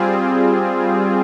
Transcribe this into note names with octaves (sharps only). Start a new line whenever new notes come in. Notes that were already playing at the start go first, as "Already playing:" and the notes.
Already playing: G3 C4 F4 G#4